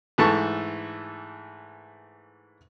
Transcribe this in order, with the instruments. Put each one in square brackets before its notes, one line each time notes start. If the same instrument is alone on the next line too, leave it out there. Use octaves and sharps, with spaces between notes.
[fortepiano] G#2 E3 A3 A5 C#6